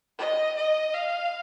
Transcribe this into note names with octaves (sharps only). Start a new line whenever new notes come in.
D#5
D#5
F5